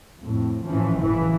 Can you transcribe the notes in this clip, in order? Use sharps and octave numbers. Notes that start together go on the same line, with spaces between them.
F2 A2
A2 E3 F3 C#4
F#1 A2 E3 F3